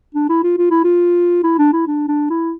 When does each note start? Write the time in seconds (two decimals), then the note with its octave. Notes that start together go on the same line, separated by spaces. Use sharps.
0.15 D4
0.29 E4
0.44 F4
0.58 F4
0.71 E4
0.84 F4
1.44 E4
1.58 D4
1.73 E4
1.87 D4
2.08 D4
2.30 E4